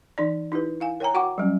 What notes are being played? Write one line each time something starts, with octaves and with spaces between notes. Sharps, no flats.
E3 D#4 D5
D#4 E4 G4 B4
E4 F5 G#5
A#4 C#5 G5 G#5 A#5
F#4 F#5 G5 C#6 D6
F#3 G3 C#4